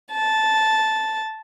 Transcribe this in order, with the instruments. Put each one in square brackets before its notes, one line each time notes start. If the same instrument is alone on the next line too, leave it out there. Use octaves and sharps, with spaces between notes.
[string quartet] A5